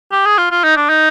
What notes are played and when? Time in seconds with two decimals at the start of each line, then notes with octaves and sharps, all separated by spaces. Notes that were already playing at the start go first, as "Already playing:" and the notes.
0.12 G4
0.26 G#4
0.38 F4
0.51 F4
0.64 D#4
0.76 D4
0.89 D#4